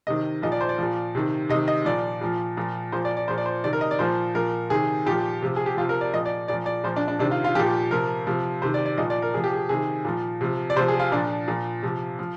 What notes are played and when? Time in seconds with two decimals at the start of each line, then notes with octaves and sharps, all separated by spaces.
0.07 C3 D#3 D#5
0.42 A#2 F3 D#5
0.52 D5
0.61 C5
0.69 D5
0.78 A#2 F3
1.15 C3 D#3
1.49 C3 D#5
1.54 D#3
1.68 D#5
1.85 A#2 F3 D5
2.21 A#2 F3
2.57 A#2 F3
2.92 A#2 F3 C5
3.05 D5
3.17 D5
3.28 A#2 F3 C5
3.38 D5
3.46 C5
3.64 C3 D#3 D5
3.73 A#4
3.81 D#5
3.91 D5
3.99 A#2 F3 C5
4.35 A#2 F3 A#4
4.70 C3 D#3 G#4
5.06 A#2 F3 G4
5.42 C3 F3
5.56 G#4
5.66 G4
5.77 F3 F4
5.81 C3
5.89 A#4
6.01 D5
6.14 A#2 F3 D#5
6.26 D5
6.48 A#2 F3 D5
6.66 D5
6.84 A#2 F3 C5
6.96 D4
7.08 D4
7.19 C3 D#3 D4
7.31 F4
7.44 F4
7.55 A#2 F3 G4
7.91 C3 F3 A#4
8.27 C3 F3
8.62 C3 D#3 C5
8.74 D5
8.86 D5
8.98 A#2 F3 D#5
9.10 D5
9.22 A#4
9.34 C3 F3 G#4
9.44 G4
9.54 G#4
9.69 C3 D#3 G#4
10.05 A#2 F3
10.41 C3 F3
10.70 D5
10.76 C3 C5
10.80 F3
10.88 G#4
10.99 F4
11.12 A#2 F3 D4
11.48 A#2 F3
11.83 C3 F3
12.19 F3